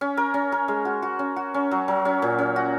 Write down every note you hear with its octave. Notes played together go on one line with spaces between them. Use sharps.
C#4
A#4
C#4
A#4
G#3
F#4
F#4
C#4
F#4
C#4
F#3
F#3
C#4
A#2
C#4
F#4